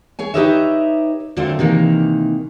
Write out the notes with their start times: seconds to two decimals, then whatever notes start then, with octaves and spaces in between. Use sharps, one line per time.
0.19 G#4 C#5 G#5
0.34 D#4 G4 B4 C#5 D#5 E5
1.37 D3 F#3 A3 A#3 C4 F4
1.59 C3 D#3 E3 A#3